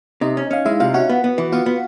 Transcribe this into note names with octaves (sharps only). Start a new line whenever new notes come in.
C3 D#4 D#5
C#4
C#4 F5
G#3 E4 E5
C3 F4 F5
C#4 F#4 F#5
B3
B3
E3
B3 F4 F5
B3